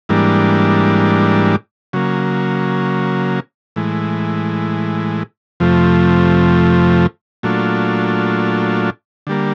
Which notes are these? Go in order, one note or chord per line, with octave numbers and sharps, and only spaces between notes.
G#2 E3 G3 A#3 D4
C#3 F#3 A#3
A2 E3 G#3
F2 C3 F3 A3
A#2 F#3 A3 D4 F4
D3 G3 A#3